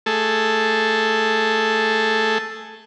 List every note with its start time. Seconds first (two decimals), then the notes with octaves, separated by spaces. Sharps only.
0.06 A3 G#4 A4